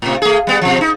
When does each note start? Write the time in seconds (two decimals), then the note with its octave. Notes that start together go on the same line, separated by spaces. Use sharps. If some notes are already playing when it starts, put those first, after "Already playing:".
0.02 A2 C3
0.22 A3 G#4
0.47 G3 B3
0.61 B2 F3
0.81 D#4